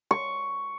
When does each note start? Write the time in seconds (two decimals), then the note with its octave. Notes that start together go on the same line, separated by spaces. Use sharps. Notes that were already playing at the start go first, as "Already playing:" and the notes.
0.11 C#6